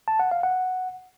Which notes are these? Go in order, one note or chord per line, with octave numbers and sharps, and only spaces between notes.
A5
F#5
F5
F#5